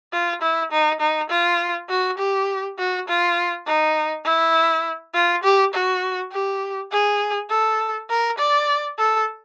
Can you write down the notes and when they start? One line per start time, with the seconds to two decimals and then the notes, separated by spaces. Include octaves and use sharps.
0.13 F4
0.42 E4
0.72 D#4
1.01 D#4
1.30 F4
1.90 F#4
2.19 G4
2.79 F#4
3.08 F4
3.67 D#4
4.25 E4
5.15 F4
5.43 G4
5.74 F#4
6.32 G4
6.92 G#4
7.50 A4
8.10 A#4
8.38 D5
8.99 A4